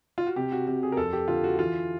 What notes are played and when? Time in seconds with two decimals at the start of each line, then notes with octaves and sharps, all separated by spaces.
0.18 F4
0.27 F#4
0.36 C3 G4
0.52 F#4
0.67 C3 F#4
0.83 G#4
0.92 A#4
0.97 F2 A4
1.13 G4
1.28 D3 F4
1.44 F#4
1.59 E3 F4